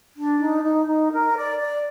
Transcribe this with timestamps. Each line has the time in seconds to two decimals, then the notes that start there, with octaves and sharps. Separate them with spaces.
0.16 D4
0.39 D#4
0.63 D#4
0.86 D#4
1.11 A#4
1.35 D5
1.58 D5